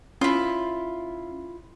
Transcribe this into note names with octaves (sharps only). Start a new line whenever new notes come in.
C#4 E4 F4